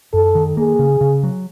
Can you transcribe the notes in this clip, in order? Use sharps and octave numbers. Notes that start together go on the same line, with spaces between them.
F#2 A4
D#3
A#3 G#4
C#3
C#3
F#3